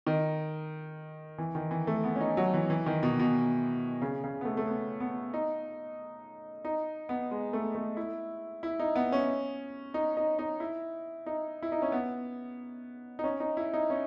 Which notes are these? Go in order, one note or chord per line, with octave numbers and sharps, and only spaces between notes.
D#3
E3
D#3
E3
A3
B3
C#4
D#4
F#3
E3
E3
D#3
B2
B2
C#3
C#3
B3
A3
A3
B3
B3
D#4
D#4
B3
G#3
A3
A3
E4
E4
D#4
B3
C#4
D#4
D#4
D#4
E4
D#4
E4
D#4
C#4
B3
D#4
C#4
D#4
E4
D#4
C#4